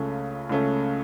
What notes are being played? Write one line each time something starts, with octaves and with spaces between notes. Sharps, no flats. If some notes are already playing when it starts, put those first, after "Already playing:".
Already playing: C#2 C#3 A3 C#4
C#2 C#3 A3 C#4